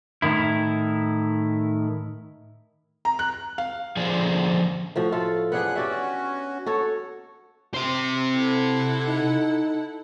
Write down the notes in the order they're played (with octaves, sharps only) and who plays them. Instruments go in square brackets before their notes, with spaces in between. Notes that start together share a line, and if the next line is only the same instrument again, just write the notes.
[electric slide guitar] A2 D#3 E4
[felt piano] A#5
F#6
F5
[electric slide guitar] D3 F3 G#4 C5 D5
[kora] A2 F3 F#4
A3 F4 A4
[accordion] F#2 F#5 F#6 [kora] B3 D4 G#4
[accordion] C#4 F#4 [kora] G4 D5 E5
[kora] F#4 A4 C#5
[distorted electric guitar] C3 C5
[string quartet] E4 A4 F#5
[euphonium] D#4